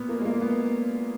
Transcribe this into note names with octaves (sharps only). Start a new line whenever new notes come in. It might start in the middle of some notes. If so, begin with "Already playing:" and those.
Already playing: A#2 B3
A#3
G#3
A#3
B3